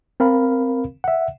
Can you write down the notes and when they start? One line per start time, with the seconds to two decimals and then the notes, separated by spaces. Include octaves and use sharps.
0.20 C4 A#4 F5 B5
1.04 E5 F#5